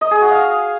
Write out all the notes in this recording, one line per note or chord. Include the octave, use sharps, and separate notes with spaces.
D#5
G#4
F#4
F5